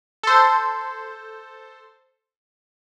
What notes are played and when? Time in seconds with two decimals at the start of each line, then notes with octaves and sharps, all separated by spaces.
0.23 A4 C5